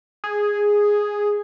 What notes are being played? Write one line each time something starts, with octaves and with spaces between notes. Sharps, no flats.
G#4